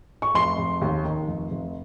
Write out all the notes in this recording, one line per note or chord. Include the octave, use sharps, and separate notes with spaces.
C#6
F1 C6
F1
D#2
D#3
F1
F1